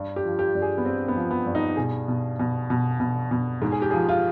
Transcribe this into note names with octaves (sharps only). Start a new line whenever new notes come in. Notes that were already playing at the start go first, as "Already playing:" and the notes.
Already playing: G2
G4
F3
G4
G2
G#4
B3
G2 C4
B3
F3
B3
G2
D#4
B2 G#4
B2
B2
B2
B2
B2
G#2
G#4
G4
F3 G#4
F4